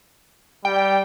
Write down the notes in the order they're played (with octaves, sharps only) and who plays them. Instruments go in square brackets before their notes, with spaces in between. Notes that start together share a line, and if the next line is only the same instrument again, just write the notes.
[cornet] G3 [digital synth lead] G5